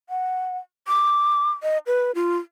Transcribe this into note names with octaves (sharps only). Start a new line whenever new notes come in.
F#5
D6
D#5
B4
F4